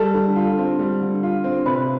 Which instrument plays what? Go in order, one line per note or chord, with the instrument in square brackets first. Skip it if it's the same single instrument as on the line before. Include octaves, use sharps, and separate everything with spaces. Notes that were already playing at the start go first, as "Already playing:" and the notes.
Already playing: [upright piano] G3 [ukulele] A4
[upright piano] D3
F4
C4
G3
D3
F4
C4
[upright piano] C3 [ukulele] B4